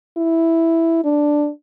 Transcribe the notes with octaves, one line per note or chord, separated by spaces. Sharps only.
E4
D4